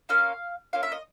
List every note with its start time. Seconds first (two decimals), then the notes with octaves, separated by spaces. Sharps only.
0.09 A#3 C#4 F4 F5
0.73 A#3 C#4 F4 F5
0.83 E5
0.92 D#5